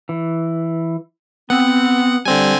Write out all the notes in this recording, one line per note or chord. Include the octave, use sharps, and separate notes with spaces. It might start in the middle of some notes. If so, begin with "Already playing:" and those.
E3
B3 C4 F#5
D3 G3 C4 G#5